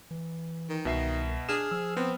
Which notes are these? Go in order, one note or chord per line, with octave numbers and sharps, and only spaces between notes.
E3
D#3
C2 B2 E5 C7
D4 G#4 F6 E7
F3 E6
B3 C4